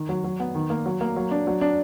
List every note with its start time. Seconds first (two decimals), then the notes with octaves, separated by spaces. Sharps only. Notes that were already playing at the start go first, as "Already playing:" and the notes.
Already playing: D#3
0.09 F#3
0.24 F#3
0.40 B3
0.55 D#3
0.70 A#3
0.86 F#3
1.01 A#3
1.16 F#3
1.31 D4
1.47 F#3
1.61 D4